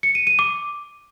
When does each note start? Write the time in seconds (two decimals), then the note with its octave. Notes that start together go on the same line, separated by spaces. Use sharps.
0.03 C#7
0.15 D#7
0.27 D#7
0.39 D6